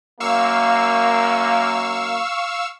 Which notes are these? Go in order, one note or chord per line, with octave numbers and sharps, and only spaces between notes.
F#2 A#3 F5 C#6 E6